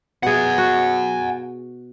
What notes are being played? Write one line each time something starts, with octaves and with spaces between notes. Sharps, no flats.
B2 G#4 F#5 G#5
F#4